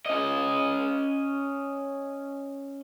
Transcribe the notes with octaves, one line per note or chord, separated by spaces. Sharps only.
C#4 D#5